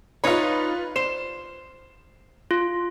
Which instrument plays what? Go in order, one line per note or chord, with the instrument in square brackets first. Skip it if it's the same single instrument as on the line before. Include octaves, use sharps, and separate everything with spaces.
[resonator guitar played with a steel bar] D#4 C#5 [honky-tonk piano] F4 B4
[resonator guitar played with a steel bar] C5 [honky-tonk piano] E7
[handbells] F4